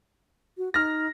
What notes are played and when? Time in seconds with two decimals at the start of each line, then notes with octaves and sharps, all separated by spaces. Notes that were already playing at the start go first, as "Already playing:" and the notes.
0.58 F#4
0.74 D#4 F6 A#6